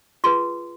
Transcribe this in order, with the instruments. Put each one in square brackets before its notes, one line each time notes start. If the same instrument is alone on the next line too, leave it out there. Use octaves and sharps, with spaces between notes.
[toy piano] F4 G#4 B4 C6